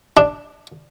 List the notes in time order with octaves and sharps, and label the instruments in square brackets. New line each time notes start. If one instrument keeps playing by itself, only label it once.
[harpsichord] D4